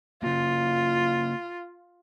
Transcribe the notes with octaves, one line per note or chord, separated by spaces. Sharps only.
C#3 A#3 F4